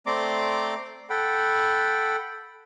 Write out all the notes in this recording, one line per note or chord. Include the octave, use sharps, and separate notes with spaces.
A3 C4 D5 A#5 C6 D6
A4 F#5 G5 B5